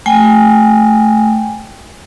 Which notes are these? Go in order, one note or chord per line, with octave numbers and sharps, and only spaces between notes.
A3 G5 G#5